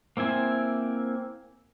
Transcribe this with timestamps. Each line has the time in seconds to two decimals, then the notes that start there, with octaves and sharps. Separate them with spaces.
0.17 A#3 C4 E4 G#5